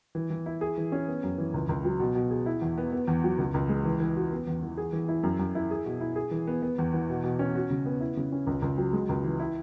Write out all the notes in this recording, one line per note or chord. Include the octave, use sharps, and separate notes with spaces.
E3
E3
E4
G#4
E3
C#4
B3
F#2
E3
C#2
C#2
F#3
B2
B2
G#4
E4
E2
B3
B3
E2
F#3
C#2
C#2
G#3
E3
E3
F#4
B3
E2
E3
G#4
E3
E4
F#2
F#2
E4
G#4
B2
E4
G#4
E3
B3
B3
E2
E3
B2
B2
C#4
F#4
C#3
B3
E4
C#3
C#4
C#2
C#2
F#3
G#3
C#2
E3
E4